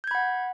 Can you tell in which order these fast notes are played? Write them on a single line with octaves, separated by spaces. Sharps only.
G6 G#6 B5 F#5